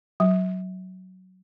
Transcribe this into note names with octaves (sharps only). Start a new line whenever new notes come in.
F#3